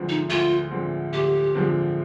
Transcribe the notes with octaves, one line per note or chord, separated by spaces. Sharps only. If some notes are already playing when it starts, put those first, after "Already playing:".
Already playing: D2 D3 F3 G#3 C4
D#4
D2 F4
D3 F3 G#3 C4
D2 G4
D3 F3 G#3 C4